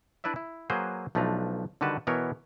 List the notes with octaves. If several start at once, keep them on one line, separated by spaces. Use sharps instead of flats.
D4 E4 B4 D5 E5
E4
F#3 A#3 G#4 B4 C5
B1 F3 A3 D4 B4 A#5
D3 D#3 G3 F#4 B4 A5
B2 E3 B3 A#4 C#5